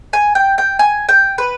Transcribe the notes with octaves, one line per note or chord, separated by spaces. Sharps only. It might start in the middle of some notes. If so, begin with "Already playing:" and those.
G#5
G5
G5
G#5
G5
B4